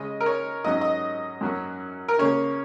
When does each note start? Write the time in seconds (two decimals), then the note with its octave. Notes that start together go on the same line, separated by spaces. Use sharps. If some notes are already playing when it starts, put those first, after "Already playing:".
Already playing: C#3 G#3 C#4 D#5
0.20 A#4
0.26 C#5
0.64 G#2 F#3 C#4 D#5
0.81 D#5
1.41 F#2 F#3 C#4
2.08 A#4
2.19 C#3 A#3 C#4 C#5